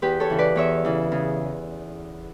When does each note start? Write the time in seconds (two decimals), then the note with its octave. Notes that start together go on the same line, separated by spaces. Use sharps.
0.02 E2 G4 B4
0.20 A4 C#5
0.30 C#3 E3
0.39 B4 D5
0.56 E2 C#5 E5
0.85 C#3 E3
1.12 C#3